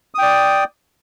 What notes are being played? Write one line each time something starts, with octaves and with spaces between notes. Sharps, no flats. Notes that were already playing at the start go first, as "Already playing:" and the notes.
D5 G5 D#6